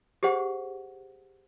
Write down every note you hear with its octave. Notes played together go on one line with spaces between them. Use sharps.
G4 G#4 C5 F#5